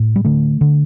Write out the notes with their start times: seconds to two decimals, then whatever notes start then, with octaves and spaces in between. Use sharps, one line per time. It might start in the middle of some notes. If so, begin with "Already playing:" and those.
Already playing: A2
0.16 G3
0.24 D3 A3
0.61 D3